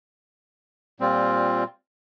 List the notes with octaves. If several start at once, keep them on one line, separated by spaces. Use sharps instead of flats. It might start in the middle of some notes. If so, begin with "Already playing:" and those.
A#2 G3 C4 F4